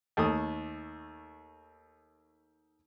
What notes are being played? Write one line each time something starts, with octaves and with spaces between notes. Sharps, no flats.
D#2 A3 D#6